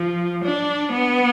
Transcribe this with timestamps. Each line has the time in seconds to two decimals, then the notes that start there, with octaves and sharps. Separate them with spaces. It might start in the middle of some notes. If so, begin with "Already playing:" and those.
Already playing: F3
0.44 D4
0.93 B3